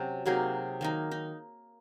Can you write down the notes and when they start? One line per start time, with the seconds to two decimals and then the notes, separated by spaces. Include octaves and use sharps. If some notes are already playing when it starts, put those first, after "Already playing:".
Already playing: C3 F#3 C#4
0.26 C3 F#3 A#3 D#4 G#4
0.81 D#3 A#3 D#4
1.11 D#4